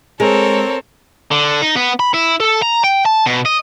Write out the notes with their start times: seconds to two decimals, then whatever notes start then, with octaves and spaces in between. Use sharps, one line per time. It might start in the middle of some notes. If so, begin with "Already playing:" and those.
0.20 G#3 C4 A4 A#4 C#5
1.31 D3
1.62 D#4
1.76 B3
2.00 B5
2.14 E4
2.40 A4
2.62 A#5
2.84 G5
3.06 A5
3.27 B2
3.46 D#5